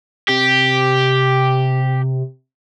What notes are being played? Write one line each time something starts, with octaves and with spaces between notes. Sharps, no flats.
C3 G4